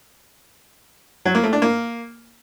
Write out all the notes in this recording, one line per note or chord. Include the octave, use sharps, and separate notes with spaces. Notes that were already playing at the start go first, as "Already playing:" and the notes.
F#3
A#3
A3
D4
A#3